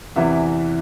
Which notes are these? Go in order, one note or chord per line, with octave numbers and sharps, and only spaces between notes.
E2 C3 E3 E5